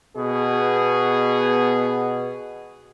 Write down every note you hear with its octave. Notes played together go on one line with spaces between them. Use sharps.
B2 B3 G#4